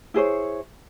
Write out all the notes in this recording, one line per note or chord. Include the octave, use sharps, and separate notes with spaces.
E4 G#4 C5 C#5